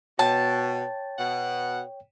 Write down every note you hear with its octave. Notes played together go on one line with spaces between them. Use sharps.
B2 C#5 G5 A5
B2 F#5